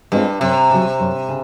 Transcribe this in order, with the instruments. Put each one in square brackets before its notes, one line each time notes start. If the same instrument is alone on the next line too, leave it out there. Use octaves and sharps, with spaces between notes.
[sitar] G2 [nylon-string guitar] G#3 C4 F4
[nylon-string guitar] F#2 [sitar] C3
[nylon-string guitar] C#3 F#3
F#2
C#3